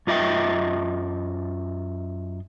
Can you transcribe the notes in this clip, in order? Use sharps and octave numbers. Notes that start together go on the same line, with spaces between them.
F#2 F4 D#5 E5 G5